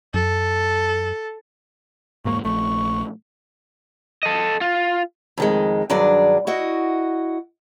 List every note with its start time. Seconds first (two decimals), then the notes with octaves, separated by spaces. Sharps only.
0.14 F#2 A4
2.25 E1 G#2 A#3 C#6
2.45 A#1 A3 C#6
4.23 A4 D#5
4.61 F4
5.38 F2 D#3 G#3
5.90 G2 D#3 F#3 D4 G#4 D5
6.47 E4 F#4 D#5